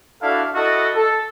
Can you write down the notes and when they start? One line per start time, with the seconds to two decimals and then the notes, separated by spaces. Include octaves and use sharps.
0.22 D4 E4 F#4 A4 F5
0.55 E4 F#4 A4 D#5
0.95 A4